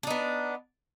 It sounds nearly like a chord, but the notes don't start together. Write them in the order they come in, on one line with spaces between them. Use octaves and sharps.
D4 D#4 B3